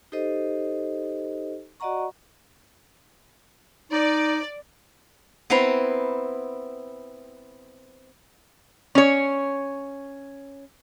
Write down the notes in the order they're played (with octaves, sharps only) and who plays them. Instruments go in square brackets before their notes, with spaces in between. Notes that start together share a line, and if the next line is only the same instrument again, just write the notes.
[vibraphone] D#4 G4 A4 C5 D#5
F#4 D5 D#5 F#5 A#5 C#6
[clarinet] D#4 [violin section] D5
[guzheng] B3 C4 E4 B4 A#5 C6
[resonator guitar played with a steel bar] C#4 C#5